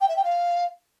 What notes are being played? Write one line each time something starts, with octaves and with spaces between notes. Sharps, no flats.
G5
E5
G5
F5